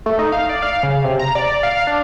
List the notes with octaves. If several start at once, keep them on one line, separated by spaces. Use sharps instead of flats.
A3
D#4
F5
D5
F5
C#3
C3
A#5
D5
F5
D4